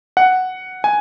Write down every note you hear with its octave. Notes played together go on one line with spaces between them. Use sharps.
F#5
G#5